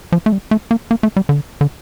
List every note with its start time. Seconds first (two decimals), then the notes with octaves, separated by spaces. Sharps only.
0.12 F3
0.26 A3
0.32 G3
0.51 A3
0.71 A#3
0.91 A#3
1.03 A3
1.16 G3
1.29 D3
1.61 D3